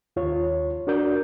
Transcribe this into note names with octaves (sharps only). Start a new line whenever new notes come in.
D#2 F4 C#5
D4 F#4 A#4 D5 G6